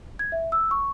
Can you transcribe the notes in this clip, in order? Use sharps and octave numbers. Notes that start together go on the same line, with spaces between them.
G#6
E5
E6
C#6